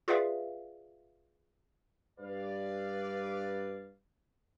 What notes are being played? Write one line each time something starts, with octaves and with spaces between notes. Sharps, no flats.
F4 G#4 B4 D5 E5 F5
G2 B4 D5 F5